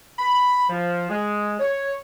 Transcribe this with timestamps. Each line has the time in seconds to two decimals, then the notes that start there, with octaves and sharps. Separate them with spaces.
0.18 B5
0.69 F3
1.10 G#3
1.60 C#5